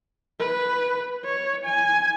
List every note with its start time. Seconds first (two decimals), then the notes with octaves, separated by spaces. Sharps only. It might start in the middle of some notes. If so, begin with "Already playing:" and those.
0.39 B4
1.25 C#5
1.65 G#5